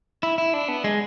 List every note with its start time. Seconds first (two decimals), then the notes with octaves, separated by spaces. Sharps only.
0.23 E4
0.38 E4
0.54 D4
0.68 B3
0.84 G#3